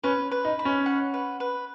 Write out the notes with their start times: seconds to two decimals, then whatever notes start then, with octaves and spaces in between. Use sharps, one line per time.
0.03 C#4 B4
0.31 B4
0.45 D#4
0.59 B5
0.65 C#4
0.86 F#5
1.14 B4
1.40 B4